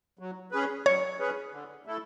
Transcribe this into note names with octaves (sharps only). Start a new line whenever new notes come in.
F#3
C#4 G#4 B4
F#3 C#5
C#4 G#4 B4
D3
A3 E4 A4